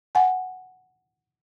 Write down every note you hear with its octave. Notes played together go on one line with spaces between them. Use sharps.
F#5 G#5